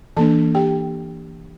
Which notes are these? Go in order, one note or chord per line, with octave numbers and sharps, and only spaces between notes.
E3 A#3 D4 A4 A5
G4 G5